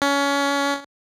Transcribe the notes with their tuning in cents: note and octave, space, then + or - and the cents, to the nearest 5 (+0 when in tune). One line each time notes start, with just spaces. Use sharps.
C#4 +25